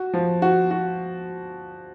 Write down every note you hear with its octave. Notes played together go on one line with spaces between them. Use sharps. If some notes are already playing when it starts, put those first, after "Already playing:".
Already playing: F#4
F3
F#4
F#4